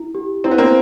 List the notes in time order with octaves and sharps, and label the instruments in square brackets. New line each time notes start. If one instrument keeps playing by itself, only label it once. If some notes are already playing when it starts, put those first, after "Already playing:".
Already playing: [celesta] E4
G4
[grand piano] C4 [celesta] E4
[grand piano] B3
A#3 C4